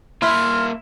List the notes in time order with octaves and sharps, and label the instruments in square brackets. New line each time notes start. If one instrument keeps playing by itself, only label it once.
[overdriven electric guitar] A#3 E5 [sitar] E4 [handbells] C6 [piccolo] F6